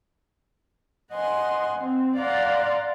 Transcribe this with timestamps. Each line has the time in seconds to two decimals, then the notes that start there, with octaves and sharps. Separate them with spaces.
1.11 D#5 F#5 G#5 C6
1.77 C4
2.16 D5 F5 F#5 A#5 C6